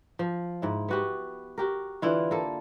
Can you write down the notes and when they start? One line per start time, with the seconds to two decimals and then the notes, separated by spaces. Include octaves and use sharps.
0.19 F3
0.62 G#2 E4
0.89 B3 F#4 G4
1.58 F#4 G4 A#4
2.02 D3 E3 E4 F4
2.31 A#3 A4